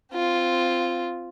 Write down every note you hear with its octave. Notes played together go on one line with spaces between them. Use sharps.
C4 F4